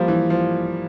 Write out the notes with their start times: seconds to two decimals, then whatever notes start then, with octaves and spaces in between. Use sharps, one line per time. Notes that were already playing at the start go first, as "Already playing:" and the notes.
Already playing: F3 G3 A#3
0.08 E3
0.30 F3